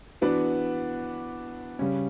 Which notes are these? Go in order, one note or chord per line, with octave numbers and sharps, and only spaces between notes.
E3 B3 D4 F#4 B4
C#3 G3 C#4